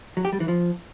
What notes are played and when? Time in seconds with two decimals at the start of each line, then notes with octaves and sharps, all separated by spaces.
0.17 F#3
0.25 G4
0.33 G3
0.40 E3
0.48 F3